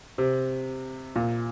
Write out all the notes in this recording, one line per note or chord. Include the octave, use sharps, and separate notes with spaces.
C3
A#2